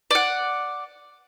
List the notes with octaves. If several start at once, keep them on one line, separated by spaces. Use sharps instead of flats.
D5 F#5